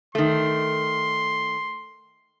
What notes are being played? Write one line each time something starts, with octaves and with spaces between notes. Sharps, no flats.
D#3 A3 C6